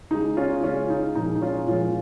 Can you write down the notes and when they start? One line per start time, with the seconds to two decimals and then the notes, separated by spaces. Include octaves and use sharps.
0.11 C#3 G#3 D#4
0.37 C#4 F4
0.64 C#3 G#3 C#4 F4
0.90 D#4
1.15 A#2 F3 G#3 D#4
1.35 D#4
1.42 C#4 F4
1.68 A#2 F3 G#3 C#4 F4